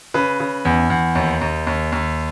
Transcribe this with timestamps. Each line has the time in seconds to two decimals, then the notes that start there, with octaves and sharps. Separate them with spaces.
0.14 C#3 B4
0.40 C#3
0.65 E2
0.90 E2
1.15 D#2
1.41 D#2
1.67 D#2
1.92 D#2